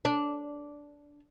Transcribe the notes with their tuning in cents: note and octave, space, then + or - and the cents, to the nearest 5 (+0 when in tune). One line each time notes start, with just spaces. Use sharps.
D4 -10